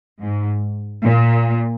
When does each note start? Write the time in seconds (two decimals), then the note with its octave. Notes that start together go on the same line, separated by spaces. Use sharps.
0.19 G#2
1.03 A#2